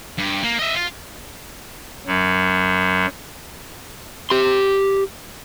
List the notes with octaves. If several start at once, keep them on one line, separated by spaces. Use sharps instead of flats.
G2
A#3
D#5 E5
F4
F#2 F#3
G4 C6